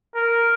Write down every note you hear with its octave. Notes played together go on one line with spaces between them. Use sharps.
A#4